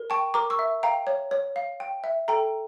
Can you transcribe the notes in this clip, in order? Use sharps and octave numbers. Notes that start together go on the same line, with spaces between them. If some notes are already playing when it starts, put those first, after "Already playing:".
Already playing: A#4
G5 A5 C#6
A#4 A#5 D6
C#6 E6
E5
F5 G5 A#5
C#5
C#5
F5
G5
E5
A4 G5 A#5